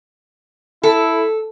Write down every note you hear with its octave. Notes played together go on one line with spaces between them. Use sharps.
E4 A4